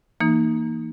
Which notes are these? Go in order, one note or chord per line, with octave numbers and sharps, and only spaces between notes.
E3 A#3 D#4